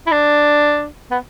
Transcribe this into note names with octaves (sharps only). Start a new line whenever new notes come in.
E4
D4
B3